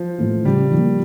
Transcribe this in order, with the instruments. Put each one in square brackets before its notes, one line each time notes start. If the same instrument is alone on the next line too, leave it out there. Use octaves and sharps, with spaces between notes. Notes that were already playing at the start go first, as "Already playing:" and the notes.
Already playing: [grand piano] F3
[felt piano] A2 E3
[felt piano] C#3 [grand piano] G3
[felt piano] F3 A#3